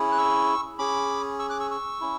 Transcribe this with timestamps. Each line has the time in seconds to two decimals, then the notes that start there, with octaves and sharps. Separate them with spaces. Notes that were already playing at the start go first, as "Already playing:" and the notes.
Already playing: C#4 E4 G#4
0.12 F#6
0.18 C#6 E6
0.78 C#4 G#4 B5 D6
1.39 C#6 E6
1.49 D6 F#6
1.60 C#6 E6
1.71 C#6 E6
2.01 C#4 E4